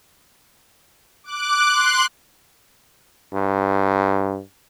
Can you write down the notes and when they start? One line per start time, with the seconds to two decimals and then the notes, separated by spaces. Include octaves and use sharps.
1.24 D6 F#6
1.70 C6 F#6
3.33 G2